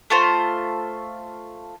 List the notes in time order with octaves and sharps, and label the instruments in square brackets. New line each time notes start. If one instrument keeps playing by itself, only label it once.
[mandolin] A3 F4 C5